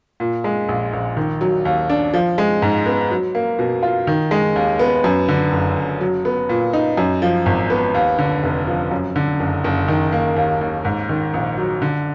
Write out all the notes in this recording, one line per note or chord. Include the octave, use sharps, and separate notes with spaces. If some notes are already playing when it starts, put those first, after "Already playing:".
A#2
G#3
A#1
A#1
D#3
F#3
D#2
D4
F3
G#3
G#2
B3
F#3
A#3
B2
F4
D#3
G#3
D#2
B3
F#2
D3
F#1
F#1
F#3
B3
A#2
D#4
F#2
F3
G#1
B3
D#2
D3
F1
F3
F#2
D3
F#1
F#1
D#3
A#3
D#2
D#2
G#2
D#3
A#1
F#3
D3